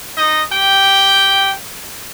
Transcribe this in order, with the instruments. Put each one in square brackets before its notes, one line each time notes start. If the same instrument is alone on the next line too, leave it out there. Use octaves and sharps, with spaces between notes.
[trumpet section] D#4 D#5
G4 G5